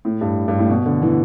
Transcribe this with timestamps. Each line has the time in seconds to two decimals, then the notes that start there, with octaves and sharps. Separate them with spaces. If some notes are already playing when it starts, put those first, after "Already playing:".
0.05 A2
0.21 G2
0.48 G2
0.59 A2
0.70 B2
0.86 D3
1.02 E3